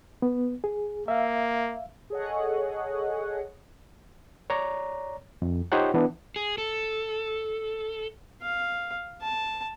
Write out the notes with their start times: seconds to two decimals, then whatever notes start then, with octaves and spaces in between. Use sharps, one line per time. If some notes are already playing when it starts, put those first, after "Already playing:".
0.22 B3
0.64 G#4
1.08 A#3 E5 F5
2.10 G#4 A4 C#5 D#5 F#5
4.50 C#5 D5 A#5
5.42 F2
5.72 D#4 F4 G4 C5 C#5 F#5
5.94 E3 B3 D4
6.36 G#4
6.58 A4
8.42 F5
9.22 A5